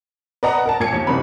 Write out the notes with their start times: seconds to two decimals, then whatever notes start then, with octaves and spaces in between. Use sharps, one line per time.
0.43 B4 D5 D#5 F#5 A#5
0.66 A#4 A5
0.80 A#2 G#6 C#7
0.92 D#2
1.07 F#1 C3 B5